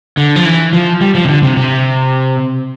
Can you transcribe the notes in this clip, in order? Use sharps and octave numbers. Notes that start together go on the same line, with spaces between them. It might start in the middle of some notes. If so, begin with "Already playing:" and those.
D3
F3
E3
F3
G3
F3
C3
D3
C3
C3